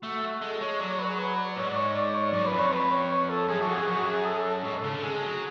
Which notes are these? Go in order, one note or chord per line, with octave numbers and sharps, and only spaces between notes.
A3 F#4
F#4
G#3 A4
G#3 C#5
F#3 D5
C#5
B4
F#4
G#4
B4
D5
G#2 C#5
D5
C#5
D5
C#5
F#2 D5
B4
F2
C#5
B4
C#5
C#5
A4
F#2 G#4
F#2 F#4
F2
G#4
F#2 F#4
G#4
A4
G#4
A4
G#2 C#5
A4
C#3
D3 A4
G#3 G#4
F#3